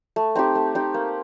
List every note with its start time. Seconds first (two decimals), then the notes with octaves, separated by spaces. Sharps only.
0.16 A3
0.35 C4 D#4 G4
0.55 A3
0.75 C4 D#4 G4
0.94 A#3